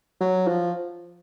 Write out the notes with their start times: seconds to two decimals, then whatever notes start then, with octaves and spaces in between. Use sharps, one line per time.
0.21 F#3
0.47 F3